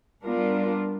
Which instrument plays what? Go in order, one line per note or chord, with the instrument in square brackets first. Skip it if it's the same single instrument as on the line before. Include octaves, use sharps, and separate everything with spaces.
[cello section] G3 B3 D4 F4 A#4